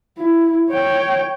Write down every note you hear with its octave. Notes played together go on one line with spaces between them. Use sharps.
E4
C#5 G5